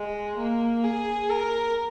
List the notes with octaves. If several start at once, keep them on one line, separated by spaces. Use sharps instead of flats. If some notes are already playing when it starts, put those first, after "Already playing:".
Already playing: G#3
A#3
G#4
A#4